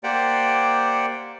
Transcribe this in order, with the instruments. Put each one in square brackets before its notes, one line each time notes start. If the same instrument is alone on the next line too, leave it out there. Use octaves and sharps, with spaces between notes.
[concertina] A#3 G4 C5 D5 F#5 G5